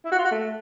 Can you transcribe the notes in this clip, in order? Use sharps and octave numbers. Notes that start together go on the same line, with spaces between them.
E4
F#4
F4
F#4
A3